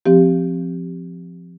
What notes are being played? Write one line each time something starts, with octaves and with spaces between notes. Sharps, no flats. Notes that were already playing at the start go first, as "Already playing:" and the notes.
F3 C4 G4